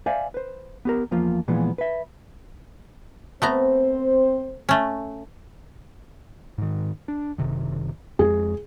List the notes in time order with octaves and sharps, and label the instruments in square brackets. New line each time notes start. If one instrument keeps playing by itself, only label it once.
[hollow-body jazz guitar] C5 D5 E5 F5 G#5
B4 C5
B3 G4 A#4
E2 F3 A#3 F4
A#2 E3 F3 G#3 B3
B4 E5
[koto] A3 B3 A#5 [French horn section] C4 C5
[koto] A3 C#4
[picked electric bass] G#2 D#3
D4
F#1 C3 D#3
[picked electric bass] F2 G#3 [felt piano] G#4